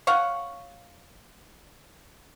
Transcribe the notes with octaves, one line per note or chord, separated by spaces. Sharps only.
C#5 F5 F#5